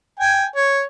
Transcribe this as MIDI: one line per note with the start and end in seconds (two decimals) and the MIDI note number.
0.20 0.46 79
0.20 0.46 80
0.56 0.83 73